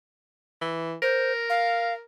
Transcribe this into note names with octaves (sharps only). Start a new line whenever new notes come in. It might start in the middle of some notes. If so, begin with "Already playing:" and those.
E3
A#4 C5
F5